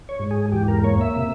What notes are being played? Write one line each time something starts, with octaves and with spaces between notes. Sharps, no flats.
C#5
G#2
G#4
E2 G4
A#4
A#3 C#5
E5
C3